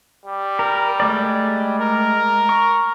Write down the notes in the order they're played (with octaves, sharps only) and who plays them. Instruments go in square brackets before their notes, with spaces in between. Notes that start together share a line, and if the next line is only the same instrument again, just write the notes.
[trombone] G3
[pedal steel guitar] A#4
G#3 A3 D5
[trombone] A#4
[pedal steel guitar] C#6